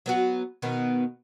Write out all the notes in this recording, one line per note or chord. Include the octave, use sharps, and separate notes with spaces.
F#3 B3 F#4
B2 D#3 B3